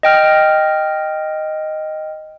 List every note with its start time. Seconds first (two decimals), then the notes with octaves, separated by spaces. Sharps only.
0.03 D#5 G5 F6